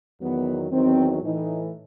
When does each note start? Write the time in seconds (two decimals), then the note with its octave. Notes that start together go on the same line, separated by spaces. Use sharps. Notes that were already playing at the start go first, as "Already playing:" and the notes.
0.20 E2 D#3 F#3 B3
0.71 E2 D#3 F#3 C4
1.21 A2 E3 D#4